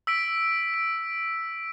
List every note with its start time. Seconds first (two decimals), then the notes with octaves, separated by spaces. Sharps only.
0.07 E6 B6 D7
0.74 D7